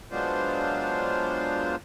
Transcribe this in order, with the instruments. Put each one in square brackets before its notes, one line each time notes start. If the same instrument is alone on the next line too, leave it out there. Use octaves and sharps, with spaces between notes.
[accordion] F#3 G#3 B3 D4 F4 C5